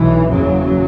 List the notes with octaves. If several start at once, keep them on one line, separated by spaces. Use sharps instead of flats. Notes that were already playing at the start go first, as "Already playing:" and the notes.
Already playing: B1 B2 E3
F#1 E2 C#3 F#3